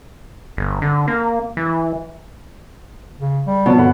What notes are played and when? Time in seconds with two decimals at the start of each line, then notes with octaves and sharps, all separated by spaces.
0.57 G1
0.82 D3
1.08 A#3
1.57 E3
3.19 C#3
3.47 G3
3.66 B2 F3 C#5 A5
3.77 G1 D3 F#5 B5